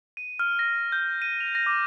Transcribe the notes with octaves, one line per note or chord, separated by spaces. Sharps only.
D#7
F6
A#6
G6
D#7
F7
A#6
D6